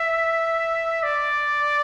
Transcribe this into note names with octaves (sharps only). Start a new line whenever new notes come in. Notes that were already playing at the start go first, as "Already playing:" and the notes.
Already playing: E5
D5